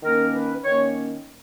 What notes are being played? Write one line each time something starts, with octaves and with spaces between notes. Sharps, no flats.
D#3 A#3 C#4 A#4
B4
D#3 A#3 C#4 C#5